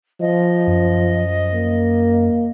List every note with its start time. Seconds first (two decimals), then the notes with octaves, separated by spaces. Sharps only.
0.21 F3 D#5
0.67 F#2
1.54 A#3